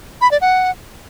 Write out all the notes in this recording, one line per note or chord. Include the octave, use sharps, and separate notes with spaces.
B5
D5
F#5